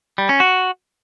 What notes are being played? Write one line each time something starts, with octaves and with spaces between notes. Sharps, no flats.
G3
C#4
F#4